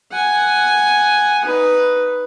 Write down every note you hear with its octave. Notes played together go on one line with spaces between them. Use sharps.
F#5 G#5
D#4 B4